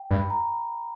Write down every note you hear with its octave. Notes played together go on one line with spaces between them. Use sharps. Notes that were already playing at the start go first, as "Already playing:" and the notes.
Already playing: G5
G2 B5
A#5